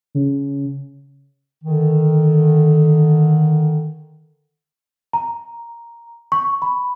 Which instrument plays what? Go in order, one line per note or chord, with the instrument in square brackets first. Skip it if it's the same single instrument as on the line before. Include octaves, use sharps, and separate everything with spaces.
[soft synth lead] C#3
[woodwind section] D3 D#3
[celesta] A#5
C#6
B5